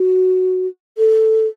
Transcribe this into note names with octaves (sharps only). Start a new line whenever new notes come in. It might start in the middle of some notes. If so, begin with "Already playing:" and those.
Already playing: F#4
A4